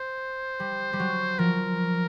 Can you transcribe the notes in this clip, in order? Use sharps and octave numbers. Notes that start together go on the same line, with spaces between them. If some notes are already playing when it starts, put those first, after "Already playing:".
Already playing: C5
G3
G3
F#3
F3 A#4